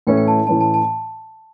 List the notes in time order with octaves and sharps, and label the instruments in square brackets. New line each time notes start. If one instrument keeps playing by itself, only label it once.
[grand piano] A2 E3 A3 C#4 E4 [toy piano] G5
[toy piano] G5
A5
[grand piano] A2 E3 A3 C#4 E4 [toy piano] A5
[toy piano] A5
A5